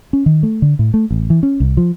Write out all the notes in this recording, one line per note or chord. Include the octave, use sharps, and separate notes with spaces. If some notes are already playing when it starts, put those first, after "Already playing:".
C#4
D#3
A3
D3
A2
A3
A1
E3
C#4
C2
F3